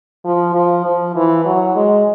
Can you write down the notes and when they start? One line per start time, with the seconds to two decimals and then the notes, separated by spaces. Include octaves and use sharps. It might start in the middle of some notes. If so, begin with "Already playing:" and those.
0.25 F3
0.55 F3
0.85 F3
1.16 E3
1.45 F#3
1.76 G#3